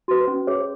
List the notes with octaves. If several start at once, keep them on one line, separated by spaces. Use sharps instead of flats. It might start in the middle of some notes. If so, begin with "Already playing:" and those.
F#4 B4
C#4
G#4 C#5